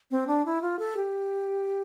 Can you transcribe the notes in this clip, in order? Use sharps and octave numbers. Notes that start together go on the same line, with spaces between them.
C4
D4
E4
F4
A4
G4